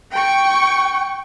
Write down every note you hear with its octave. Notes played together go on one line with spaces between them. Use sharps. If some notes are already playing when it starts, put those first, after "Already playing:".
G5 C#6